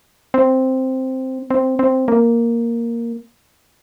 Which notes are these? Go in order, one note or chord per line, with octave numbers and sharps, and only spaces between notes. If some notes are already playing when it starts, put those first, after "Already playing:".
C4
C4
C4
A#3